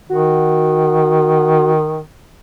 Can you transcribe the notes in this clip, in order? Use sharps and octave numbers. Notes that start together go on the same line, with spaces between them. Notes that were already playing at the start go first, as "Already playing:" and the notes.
D#3 F#4